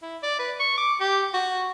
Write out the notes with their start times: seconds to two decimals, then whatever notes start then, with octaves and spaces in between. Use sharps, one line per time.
0.02 E4
0.23 D5
0.39 B4
0.59 C#6
0.77 D6
1.00 G4
1.33 F#4